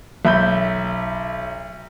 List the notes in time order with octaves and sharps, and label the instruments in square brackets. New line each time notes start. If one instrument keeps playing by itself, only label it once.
[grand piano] B1 E5 B5 G6